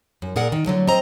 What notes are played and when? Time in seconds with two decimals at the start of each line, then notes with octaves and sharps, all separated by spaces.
0.22 F#2
0.36 A#2 G#4 A#4 D5 F#5
0.52 D#3
0.66 D3 F#3 A3
0.87 C4 D#5 A#5